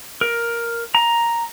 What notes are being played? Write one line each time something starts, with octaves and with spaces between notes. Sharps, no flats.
A#4
A#5